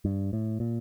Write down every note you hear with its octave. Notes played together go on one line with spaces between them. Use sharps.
G2
A2
A#2